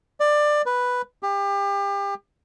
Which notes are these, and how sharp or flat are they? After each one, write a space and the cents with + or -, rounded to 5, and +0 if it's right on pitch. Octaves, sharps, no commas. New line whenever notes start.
D5 +15
B4 +0
G4 +30